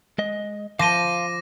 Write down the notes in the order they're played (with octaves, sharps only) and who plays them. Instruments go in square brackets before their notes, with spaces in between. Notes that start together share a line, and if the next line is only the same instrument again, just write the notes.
[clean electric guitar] G#3 D#5
[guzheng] F3 F4 [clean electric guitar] F5 C6 [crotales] D6 A#6 D#7